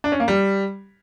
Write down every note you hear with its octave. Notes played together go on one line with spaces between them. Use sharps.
D4
C#4
A#3
G3